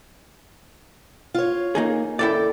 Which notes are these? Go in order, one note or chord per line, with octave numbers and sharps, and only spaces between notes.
F4 C#5
A#3 D#4 G#4
D#2 E4 A4 D5 G5